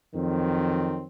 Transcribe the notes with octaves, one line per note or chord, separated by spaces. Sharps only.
F2 D#3 F#3 C4